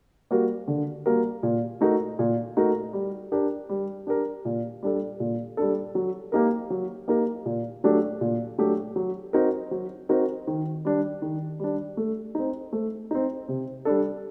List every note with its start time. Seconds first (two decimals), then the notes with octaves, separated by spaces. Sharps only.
0.31 G3 A#3 F#4 A#4
0.68 D3
1.06 G3 A#3 F#4 A#4
1.43 A#2
1.81 A3 D#4 F#4 A#4
2.19 A#2
2.57 A3 D#4 F#4 A#4
2.93 G3
3.32 D4 G4 A#4
3.69 G3
4.07 D4 G4 A#4
4.45 A#2
4.83 G3 D4 A4
5.20 A#2
5.57 G3 D4 A4
5.95 F#3
6.32 A#3 D#4 G4 A#4
6.70 F#3
7.08 A#3 D#4 G4 A#4
7.46 A#2
7.84 F#3 A3 D4 G4
8.21 A#2
8.58 F#3 A3 D4 G4
8.96 F#3
9.33 C4 D#4 F#4 A#4
9.71 F#3
10.09 C4 D#4 F#4 A#4
10.47 D#3
10.85 G3 D4
11.22 D#3
11.60 G3 D4
11.97 A3
12.35 C4 D#4
12.73 A3
13.11 C4 D#4
13.48 C3
13.85 G3 D4 A4